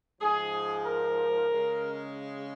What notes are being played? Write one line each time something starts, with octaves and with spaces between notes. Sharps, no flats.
G#2 F3 G#3 G#4
A#4
C#3 G#3